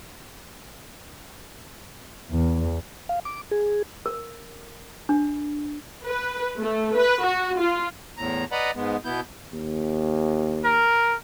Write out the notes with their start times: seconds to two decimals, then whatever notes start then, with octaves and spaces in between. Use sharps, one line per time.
2.30 E2
3.09 F5
3.25 D6
3.51 G#4
4.06 A#4
5.09 D4
6.05 B4
6.59 A3
6.94 B4
7.24 F#4
7.58 F4
8.17 E2 A2 A#5
8.52 B4 D5 D#5 F#5 A#5 B5
8.76 G#2 G#3 B3
9.05 B2 B3 E4 G6
9.54 D#2
10.64 A#4